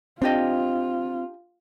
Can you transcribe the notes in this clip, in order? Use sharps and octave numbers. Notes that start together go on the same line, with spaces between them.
C4 D4 F4 G4 D#5